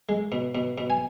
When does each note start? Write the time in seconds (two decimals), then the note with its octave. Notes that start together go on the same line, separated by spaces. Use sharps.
0.09 G#3
0.32 B2
0.55 B2
0.78 B2
0.90 G#5